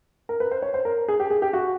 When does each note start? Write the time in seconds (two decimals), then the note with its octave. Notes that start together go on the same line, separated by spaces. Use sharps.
0.29 A#4
0.40 B4
0.51 C5
0.62 C#5
0.74 C5
0.85 A#4
1.08 G#4
1.20 G4
1.30 G#4
1.42 G4
1.53 F#4